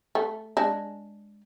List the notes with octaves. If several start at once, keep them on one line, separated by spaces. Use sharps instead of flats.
A3
G#3 D4